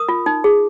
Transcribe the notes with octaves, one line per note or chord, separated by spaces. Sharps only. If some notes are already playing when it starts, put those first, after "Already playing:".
Already playing: A#4 D#6
F4
D#4
G#4